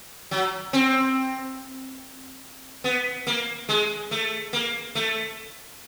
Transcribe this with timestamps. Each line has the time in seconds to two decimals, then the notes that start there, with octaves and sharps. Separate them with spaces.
0.31 F#3
0.73 C4
2.84 B3
3.27 A#3
3.69 G#3
4.11 A3
4.53 A#3
4.95 A3